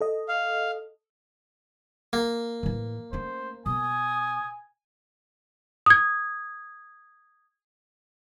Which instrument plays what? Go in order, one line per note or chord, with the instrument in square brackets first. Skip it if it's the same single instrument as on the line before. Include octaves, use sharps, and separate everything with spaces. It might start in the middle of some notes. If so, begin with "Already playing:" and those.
[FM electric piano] A4 D#5
[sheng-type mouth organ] F5
[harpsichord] A#3
[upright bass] A2 E3
[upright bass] A3 C#4 [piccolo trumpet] C5
[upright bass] B2 [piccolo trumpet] G#5 [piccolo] D#6
[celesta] D#6 G#6